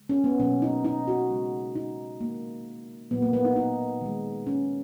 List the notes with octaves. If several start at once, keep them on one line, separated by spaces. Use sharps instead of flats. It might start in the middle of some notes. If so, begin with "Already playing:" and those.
Already playing: C#3 G#3
C#4
B3
B2 F#3 A#3 C#4
D#4
D#4
F#4
C#3 G#3
D#4
D#3 G#3 A#3
A#2 F#3 A#3 B3
A#3
B3
D#4
D#4
D#3 G#3
C#4